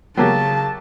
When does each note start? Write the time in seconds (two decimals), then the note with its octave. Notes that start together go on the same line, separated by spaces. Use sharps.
0.17 C#3 F#3 A#3 G4 A5